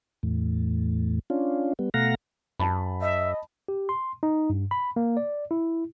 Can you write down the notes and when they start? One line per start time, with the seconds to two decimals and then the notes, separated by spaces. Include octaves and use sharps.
0.23 E2 A2
1.30 C#4 D4 F4
1.79 G3 B3
1.94 B2 A3 F5 F#5 A#5 A#6
2.60 F#2 A5 B5
3.01 D#5 E5
3.68 G4
3.89 C6
4.23 D#4
4.50 G2
4.71 B5
4.96 A#3
5.17 D5
5.51 E4